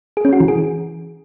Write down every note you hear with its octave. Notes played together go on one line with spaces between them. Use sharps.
G#4
C#4
F#4
E3
G#4